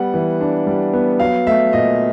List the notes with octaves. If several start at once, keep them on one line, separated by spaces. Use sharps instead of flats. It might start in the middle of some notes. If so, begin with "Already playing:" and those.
Already playing: G3 B3 F#5
E3
D4
G3
B3
F#3 F5
A3 E5
A#2 D#5